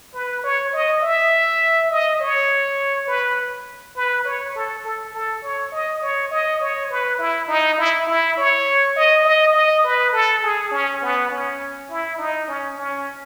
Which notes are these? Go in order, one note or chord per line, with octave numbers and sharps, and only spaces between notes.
B4
C#5
D#5
E5
D#5
C#5
B4
B4
C#5
A4
A4
A4
C#5
D#5
C#5
D#5
C#5
B4
E4
D#4
E4
E4
C#5
D#5
D#5
D#5
B4
A4
G#4
C#4
B3
C#4
E4
D#4
C#4
C#4